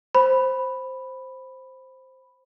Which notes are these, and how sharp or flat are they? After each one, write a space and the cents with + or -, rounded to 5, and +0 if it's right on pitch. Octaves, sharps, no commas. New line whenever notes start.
C5 +0 B5 +0